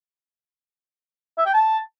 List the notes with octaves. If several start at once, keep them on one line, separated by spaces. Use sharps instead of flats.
E5
G5
A5